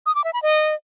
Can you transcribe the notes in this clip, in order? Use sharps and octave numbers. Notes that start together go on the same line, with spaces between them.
D#6
D6
E5
B5
D#5